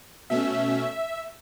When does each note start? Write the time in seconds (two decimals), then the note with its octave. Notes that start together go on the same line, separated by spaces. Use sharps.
0.30 B2 A3 C#4 E5